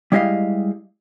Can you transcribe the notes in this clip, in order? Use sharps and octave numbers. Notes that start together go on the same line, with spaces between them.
G3 G#3 E4 G4 D#5 F5